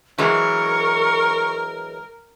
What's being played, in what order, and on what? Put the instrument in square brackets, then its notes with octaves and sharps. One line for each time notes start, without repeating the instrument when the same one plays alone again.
[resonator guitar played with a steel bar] E3 F#3 G#3 [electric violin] A#4 [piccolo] C#6